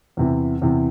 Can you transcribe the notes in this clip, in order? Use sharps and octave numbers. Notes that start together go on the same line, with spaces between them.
E2 C3 E3
E2 C3 E3